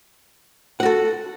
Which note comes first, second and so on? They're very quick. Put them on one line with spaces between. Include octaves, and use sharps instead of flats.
F#5 F#4 A4